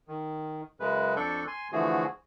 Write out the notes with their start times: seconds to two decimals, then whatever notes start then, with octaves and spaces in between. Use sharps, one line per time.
0.08 D#3
0.80 F#2 C#3 G#3 B4
1.16 F2 D4 A4 D5 C#6 G6
1.47 G#5 C6
1.72 D3 E3 F3 A3 F#4 G#4